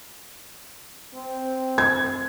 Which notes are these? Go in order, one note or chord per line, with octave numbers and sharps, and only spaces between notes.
C4
G#6